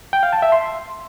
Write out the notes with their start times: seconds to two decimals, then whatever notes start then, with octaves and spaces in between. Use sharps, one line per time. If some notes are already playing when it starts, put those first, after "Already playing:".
0.13 G5
0.23 F5
0.33 A5
0.42 E5
0.52 C6